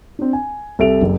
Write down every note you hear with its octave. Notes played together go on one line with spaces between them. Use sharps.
C4 D4
G#5
C2 A4 E5 D7 F7
F#1 F#2